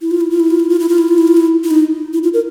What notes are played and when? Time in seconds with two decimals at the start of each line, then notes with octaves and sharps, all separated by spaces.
0.01 E4
0.11 F4
0.21 E4
0.30 F4
0.40 E4
0.50 F4
0.60 E4
0.69 F4
0.80 E4
0.89 F4
0.98 E4
1.08 F4
1.18 E4
1.27 F4
1.37 E4
1.64 E4
1.71 D#4
2.13 E4
2.23 F4
2.34 A#4